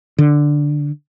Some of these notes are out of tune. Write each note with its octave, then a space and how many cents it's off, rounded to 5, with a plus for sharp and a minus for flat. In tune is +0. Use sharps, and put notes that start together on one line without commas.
D3 +5